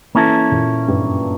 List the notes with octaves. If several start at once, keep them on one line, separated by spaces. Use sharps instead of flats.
E3 A#3 C#4 E4 A4
A#2
G2
F#2